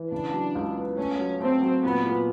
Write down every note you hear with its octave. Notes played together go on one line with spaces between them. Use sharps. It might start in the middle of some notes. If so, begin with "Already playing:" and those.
Already playing: E3
C#3 D4
F#3
C#2
B3
A3 C#4
F#3
A3 C4
F#3
A#2 B3
A#2